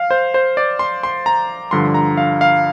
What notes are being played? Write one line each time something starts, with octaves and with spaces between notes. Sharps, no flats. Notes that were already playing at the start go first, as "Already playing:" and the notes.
Already playing: F5
C5
C5
D5
C6
C6
A#5
G2 D3 F3 C6
A#5
F5
F5